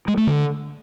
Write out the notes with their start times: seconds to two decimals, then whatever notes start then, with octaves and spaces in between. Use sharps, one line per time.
0.08 G#3
0.17 A3
0.27 D3